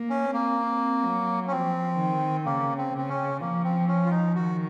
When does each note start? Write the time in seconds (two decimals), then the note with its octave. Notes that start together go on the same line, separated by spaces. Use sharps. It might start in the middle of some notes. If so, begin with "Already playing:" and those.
Already playing: A#3
0.10 C#4
0.25 C4
0.33 A#3
0.57 C4
1.04 F#3
1.48 C#4
1.51 F3 C4
1.99 D#3
2.46 C#3 A#3
2.78 C4
2.94 C#3 C4
3.09 C#4
3.41 F3 A#3
3.64 C4
3.88 C#4
4.06 F4
4.11 D#4
4.35 D#3 F#4